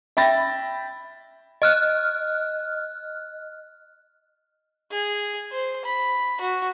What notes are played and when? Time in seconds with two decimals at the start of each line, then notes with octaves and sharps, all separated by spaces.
0.17 E5 G5 B5 A6 A#6
1.62 D#5 F6 F#6
4.91 G#4
5.52 C5
5.85 B5
6.41 F#4